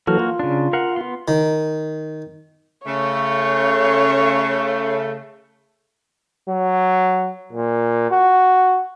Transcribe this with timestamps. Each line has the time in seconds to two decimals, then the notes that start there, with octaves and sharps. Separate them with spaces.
0.07 E3 F#3 A#3 F#4 A4 F6
0.20 F4
0.39 C#3 D4
0.73 A#4 F5 F#5
0.96 B3 C6
1.28 D#3
2.86 C#3 A3 C#5
6.49 F#3
7.53 A#2
8.11 F#4